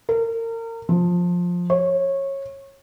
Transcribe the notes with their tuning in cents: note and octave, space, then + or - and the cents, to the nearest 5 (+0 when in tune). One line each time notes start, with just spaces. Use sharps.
A#4 -35
F3 +15
C#5 -20